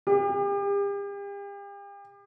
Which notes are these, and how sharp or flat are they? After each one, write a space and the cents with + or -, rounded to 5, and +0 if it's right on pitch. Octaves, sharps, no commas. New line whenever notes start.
G4 +40